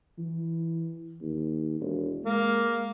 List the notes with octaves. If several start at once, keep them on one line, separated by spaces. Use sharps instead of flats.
E3
D#2
E1
G#3 A#3